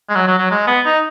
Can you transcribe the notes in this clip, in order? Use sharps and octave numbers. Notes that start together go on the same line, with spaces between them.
G#3
F#3
F#3
F#3
G#3
B3
D#4